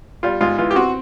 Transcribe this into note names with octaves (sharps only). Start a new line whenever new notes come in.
G3 F4
G#2 F4
E3 F4
G4
C4 F#4